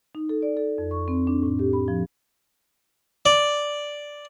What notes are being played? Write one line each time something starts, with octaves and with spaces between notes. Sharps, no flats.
D#4
A4
D5
A4
F2
C#6
C4
D4
A2
G4
B5
F3
D5